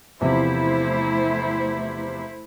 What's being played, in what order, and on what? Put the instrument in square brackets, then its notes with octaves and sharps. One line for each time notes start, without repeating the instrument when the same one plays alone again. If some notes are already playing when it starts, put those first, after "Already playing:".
[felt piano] E2 C3 F3 [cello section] A3 E4 C5